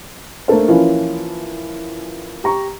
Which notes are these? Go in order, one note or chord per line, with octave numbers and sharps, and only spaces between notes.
A3 A#3 D4 A4 C5
E3 F3 A#3 C#4 E4 F4
G4 A#5 C#6